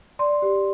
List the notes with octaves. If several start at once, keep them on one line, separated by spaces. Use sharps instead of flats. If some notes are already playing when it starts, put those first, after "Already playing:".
D5 C6
G4